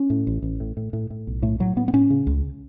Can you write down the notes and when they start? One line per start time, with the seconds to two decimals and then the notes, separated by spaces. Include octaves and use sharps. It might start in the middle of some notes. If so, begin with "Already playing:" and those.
Already playing: C#4
0.10 A2
0.27 A1
0.42 A1
0.60 A2
0.77 A2
0.93 A2
1.10 A2
1.27 B1
1.42 A2 A3
1.60 A2 F#3
1.76 A2 B3
1.88 B3
1.93 A2 C#4
2.10 C#3
2.27 C#2